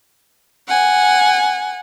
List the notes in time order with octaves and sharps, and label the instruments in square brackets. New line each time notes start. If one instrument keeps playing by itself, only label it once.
[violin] F#5 G#5